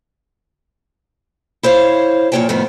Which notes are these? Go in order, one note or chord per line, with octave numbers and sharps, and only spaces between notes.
E4 C5 C#5 F5
F2 A#2 C#4 C#5 G5 A5
F2 A2 D#3 B3